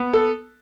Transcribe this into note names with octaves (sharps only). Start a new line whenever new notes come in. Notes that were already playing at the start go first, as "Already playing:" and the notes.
Already playing: B3
A4